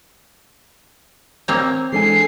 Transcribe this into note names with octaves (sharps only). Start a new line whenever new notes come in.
A#3 C4 C#5 G6
E3 G#3 D4 G#4 A4 G#5 C7